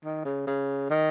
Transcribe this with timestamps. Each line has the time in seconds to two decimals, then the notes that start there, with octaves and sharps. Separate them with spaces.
0.04 D#3
0.25 C#3
0.47 C#3
0.90 D#3